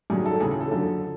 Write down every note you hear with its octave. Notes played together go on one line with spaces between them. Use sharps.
G2 D#3 F#3 G#4
A4
D#2 C#3 E3 G#4
G#4
A4
F#2 D3 F3 A4